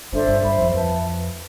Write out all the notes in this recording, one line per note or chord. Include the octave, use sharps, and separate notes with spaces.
G1 G2 D4 A4 C5 E5
G1 G2
G1 G2 C5 E5 B5
F2
F2 B4 E5 A5